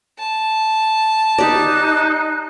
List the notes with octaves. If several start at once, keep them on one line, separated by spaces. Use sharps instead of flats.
A5
D#4 G4 D5 F#6